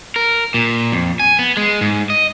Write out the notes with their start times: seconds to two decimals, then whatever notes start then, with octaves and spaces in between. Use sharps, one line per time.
0.16 A#4
0.54 A#2
0.92 F2
1.20 G#5
1.39 B3
1.57 G#3
1.81 G#2
2.10 D#5